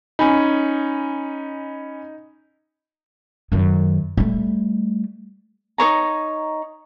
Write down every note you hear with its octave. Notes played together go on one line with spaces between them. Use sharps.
C#4 D#4 G#5 B5
F#2 D#3
G3 A3
D#4 C5 C#5 A#5